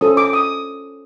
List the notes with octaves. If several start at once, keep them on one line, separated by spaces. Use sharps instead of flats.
C#4 F4 A4 C5 D#6
D6
D#6